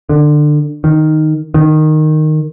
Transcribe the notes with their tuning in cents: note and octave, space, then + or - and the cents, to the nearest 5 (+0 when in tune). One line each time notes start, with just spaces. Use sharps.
D3 +25
D#3 -5
D#3 -10